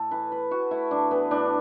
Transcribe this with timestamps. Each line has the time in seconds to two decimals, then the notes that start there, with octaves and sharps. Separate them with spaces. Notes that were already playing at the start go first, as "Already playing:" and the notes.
Already playing: A2 A4
0.11 E3 B4
0.32 A2 B4
0.51 A2 F#4
0.71 A3 E4
0.91 A2 D4
1.11 E3 B3
1.31 A2 D4